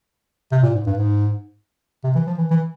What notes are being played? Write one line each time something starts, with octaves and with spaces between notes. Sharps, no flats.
C3
A#2
G#2
G2
G#2
C3
E3
F3
E3
E3